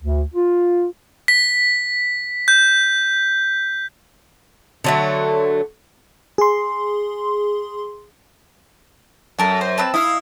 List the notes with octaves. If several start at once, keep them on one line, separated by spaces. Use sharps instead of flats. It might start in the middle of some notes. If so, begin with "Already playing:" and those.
D2
F4
B6
G6
D3 F#3 A3
G#4 C6
F#2 A4 A#4 A5
C5
C4 B4 A5
E4 D#5 F5